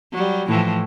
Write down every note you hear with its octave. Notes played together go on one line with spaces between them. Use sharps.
F#3 G3
A2 E3 F3